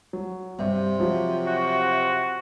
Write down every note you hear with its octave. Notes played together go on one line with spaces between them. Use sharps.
F#3
G2 C3
F3 F#3
F#4